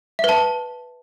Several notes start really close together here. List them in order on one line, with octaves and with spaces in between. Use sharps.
E5 B4 A5